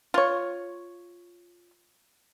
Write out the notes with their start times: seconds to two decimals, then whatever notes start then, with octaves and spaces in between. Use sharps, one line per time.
0.14 F4 C#5